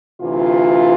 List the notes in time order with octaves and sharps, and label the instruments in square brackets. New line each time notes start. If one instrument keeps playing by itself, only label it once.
[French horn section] D2 C3 E3 F4